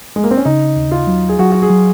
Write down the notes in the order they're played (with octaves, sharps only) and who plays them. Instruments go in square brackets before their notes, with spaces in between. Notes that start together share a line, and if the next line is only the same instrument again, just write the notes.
[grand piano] G#3
A#3
C4
C#4
[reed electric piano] C#3 [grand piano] D#4
[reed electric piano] D#2
[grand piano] F4
[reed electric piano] F#3
[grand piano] G#4
[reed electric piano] F#3 [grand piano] F#4
[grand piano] F#4
G#4
[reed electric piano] F#3